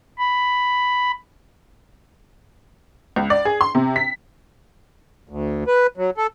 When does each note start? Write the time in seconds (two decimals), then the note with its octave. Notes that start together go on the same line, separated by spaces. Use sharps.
0.18 B5
3.16 C#2
3.30 D5
3.45 G#4
3.61 C6
3.75 C3
3.96 B6
5.29 D2
5.67 B4
5.97 F#3
6.17 A4